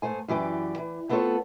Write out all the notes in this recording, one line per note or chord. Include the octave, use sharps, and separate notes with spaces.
G#2 A3 C5 G#5
F#2 E3 G4 D5
E3
A3 B3 C4 F4 A4 C#5